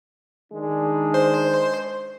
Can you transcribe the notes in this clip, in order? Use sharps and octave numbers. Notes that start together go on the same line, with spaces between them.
D#3 G#3 D4
C5